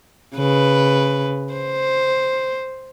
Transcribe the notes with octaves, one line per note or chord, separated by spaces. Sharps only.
C#3 B4
C5